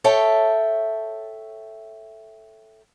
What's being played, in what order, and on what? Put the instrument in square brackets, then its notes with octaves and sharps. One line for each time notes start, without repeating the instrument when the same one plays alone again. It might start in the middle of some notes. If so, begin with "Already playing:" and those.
[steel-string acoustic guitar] A4 C#5 E5 G5 A5